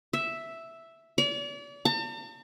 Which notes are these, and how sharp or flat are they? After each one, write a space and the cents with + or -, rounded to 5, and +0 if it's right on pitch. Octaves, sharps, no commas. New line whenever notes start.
E5 +0
D5 -40
A5 +45